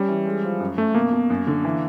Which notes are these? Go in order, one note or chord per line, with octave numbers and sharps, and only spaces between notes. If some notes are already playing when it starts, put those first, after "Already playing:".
Already playing: G3 C#4
E3
G#3
F3
F#2
F#2 A3
B2 A#3
B2
F#2
D3
E3